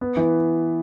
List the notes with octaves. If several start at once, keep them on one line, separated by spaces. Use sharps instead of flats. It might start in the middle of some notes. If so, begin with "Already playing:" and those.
B3
E3